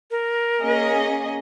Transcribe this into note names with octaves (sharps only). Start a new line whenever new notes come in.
A#4
A#3 C#4 G#4 D#5